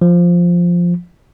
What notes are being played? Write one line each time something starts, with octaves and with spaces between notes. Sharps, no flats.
F3